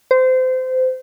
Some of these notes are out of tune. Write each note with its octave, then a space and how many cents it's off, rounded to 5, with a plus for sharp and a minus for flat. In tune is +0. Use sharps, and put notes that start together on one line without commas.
C5 -25